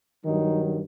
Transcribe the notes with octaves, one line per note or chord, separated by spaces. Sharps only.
G2 D#3 F#3 D#4